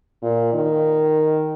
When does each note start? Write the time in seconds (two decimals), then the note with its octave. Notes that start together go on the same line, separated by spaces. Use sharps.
0.22 A#2
0.53 D#3